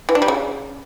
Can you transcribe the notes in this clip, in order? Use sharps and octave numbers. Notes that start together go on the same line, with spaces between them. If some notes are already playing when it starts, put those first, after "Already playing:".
E3
D4
G3
C#3